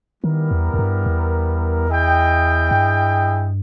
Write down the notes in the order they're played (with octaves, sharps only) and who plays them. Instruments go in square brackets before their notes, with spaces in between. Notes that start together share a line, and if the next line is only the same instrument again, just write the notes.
[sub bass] D#3 [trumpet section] G3 B3 E4 A#4
[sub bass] E2
E2
G2
E2
[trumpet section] E4 G#4 D#5 G5
[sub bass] G2